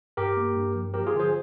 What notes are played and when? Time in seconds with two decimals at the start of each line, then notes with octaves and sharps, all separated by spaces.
0.17 G2 G4 A#4
0.37 A#3
0.55 G2
0.75 F3
0.94 F3 G4 A#4
1.07 F4 G#4
1.14 D3
1.20 G#4 C5